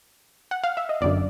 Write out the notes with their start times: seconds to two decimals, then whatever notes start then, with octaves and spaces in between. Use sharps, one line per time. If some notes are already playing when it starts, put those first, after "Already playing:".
0.51 F#5
0.64 F5
0.77 E5
0.89 D#5
1.01 G1 F#2 D3 D5